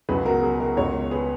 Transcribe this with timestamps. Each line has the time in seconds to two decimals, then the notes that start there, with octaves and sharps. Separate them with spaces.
0.09 C#2 B2 F#3 G#4 B4
0.26 F#4 A#4
0.43 G#4
0.60 F#4 A#4
0.77 C#2 B2 G#3 A#4 C#5
1.11 G#4 B4